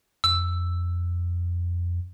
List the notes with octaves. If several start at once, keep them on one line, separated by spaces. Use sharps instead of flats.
F2 E6